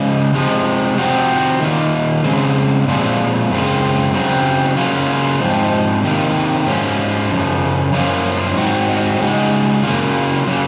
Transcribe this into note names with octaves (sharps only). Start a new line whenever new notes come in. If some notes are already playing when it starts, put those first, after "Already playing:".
Already playing: C#3 F3 G#3
C3 F3 G#3
C3 F3 C4 F#4
D#3 A#3 F4
C#3 G#3 C4
A#2 F3 G#3 C4
F#2 C#3 G#3 C4 F4
C#3 F#3 C4
C#3 F#3 A#3 C#4 F4
G#2 F3 C4
C3 D#3 A#3
G#2 F#3 C#4 F4
F#2 C#3 F3
F#2 F3 A#3 C#4 F4
G#2 F#3 C4 F#4
C#3 G#3 D#4 F#4
C#3 F#3 A#3 F4
C#3 F#3 A#3